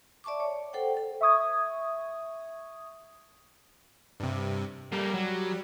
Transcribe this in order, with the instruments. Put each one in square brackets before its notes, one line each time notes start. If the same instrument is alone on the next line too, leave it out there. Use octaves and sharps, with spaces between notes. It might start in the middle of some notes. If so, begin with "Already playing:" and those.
[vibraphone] D5 E5 A5 C#6 D6
C#5
A4 C5 F#5 G5
A4
[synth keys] E5 C#6 D#6 G#6
[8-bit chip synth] G2 C3
[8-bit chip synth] G3 [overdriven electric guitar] A3 A#3
[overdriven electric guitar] F#3